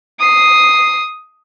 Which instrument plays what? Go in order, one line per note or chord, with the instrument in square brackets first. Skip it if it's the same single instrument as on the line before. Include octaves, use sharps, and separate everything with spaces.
[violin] D#6 C7